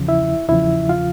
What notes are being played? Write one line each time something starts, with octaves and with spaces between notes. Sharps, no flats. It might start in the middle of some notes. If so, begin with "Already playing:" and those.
Already playing: E2 C#3 F3
E4 E5
E2 C#3 F3 E4 E5
F4 F5